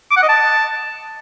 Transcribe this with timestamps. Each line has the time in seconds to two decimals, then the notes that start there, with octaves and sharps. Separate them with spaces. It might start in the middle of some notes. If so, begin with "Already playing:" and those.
0.11 D6
0.17 F#5
0.23 D#5
0.29 A5